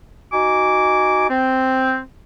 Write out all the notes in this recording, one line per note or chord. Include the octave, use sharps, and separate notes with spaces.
D#4 F#4 G#5 D6
C4